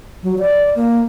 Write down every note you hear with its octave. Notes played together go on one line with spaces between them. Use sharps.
F#3
D5
A#3